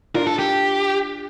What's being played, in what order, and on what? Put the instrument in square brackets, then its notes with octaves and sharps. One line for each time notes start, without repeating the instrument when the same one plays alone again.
[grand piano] D4 F4 [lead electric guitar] A#4
[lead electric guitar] A4
G4